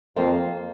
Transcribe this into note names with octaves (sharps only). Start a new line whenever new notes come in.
F2 A#3 F4 C5